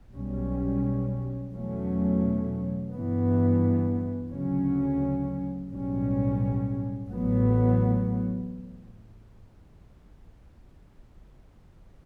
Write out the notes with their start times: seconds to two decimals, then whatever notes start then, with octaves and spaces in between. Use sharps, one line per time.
0.13 B1 B2 G3 C#4
1.52 E2 B2 F#3 A3 C#4
2.92 G2 E3 B3
4.30 D2 C#3 F#3 C#4
5.71 B1 A2 G3 C#4
7.09 A1 A2 F#3 B3